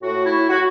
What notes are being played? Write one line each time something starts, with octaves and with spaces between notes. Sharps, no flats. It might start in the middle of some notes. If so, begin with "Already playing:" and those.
A2 A3 F#4
E4
F#4